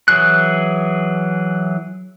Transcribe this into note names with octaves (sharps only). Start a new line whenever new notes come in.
E3 F#3 G#4 F#6